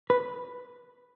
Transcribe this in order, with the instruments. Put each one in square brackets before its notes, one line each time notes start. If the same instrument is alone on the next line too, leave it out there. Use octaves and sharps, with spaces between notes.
[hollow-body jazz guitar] B4